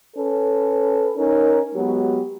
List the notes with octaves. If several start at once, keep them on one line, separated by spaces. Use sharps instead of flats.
C#4 A4 B4
C#4 D#4 A#4
F#3 G#3 B3 F#4 G4